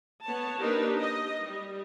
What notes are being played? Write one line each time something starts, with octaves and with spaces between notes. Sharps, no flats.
B3 C#5 A5
A#3 D4 D#4 G4 A#4 B4
D#5
G3